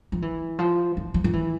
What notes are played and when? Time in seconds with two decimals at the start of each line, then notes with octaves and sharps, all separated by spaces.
0.12 F3
0.22 E3
0.59 F3
0.97 E3
1.14 F3
1.24 F3
1.33 E3